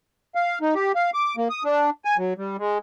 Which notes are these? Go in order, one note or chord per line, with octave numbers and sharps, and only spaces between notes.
F5
D#4
G4
F5
D6
A#3
D#6
D4
G#5
F#3
G3
G#3